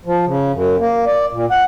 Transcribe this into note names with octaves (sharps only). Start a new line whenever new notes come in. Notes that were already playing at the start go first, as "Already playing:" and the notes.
F3
C#3
F#2
A#3
D5
A#2
F#5